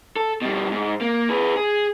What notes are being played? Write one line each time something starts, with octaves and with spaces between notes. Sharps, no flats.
A4
B2 G3
G#2
A#3
G#4 B4
G#4